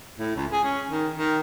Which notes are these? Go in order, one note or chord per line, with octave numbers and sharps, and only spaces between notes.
A2
C#2
G#4
C#4
D#3
D#3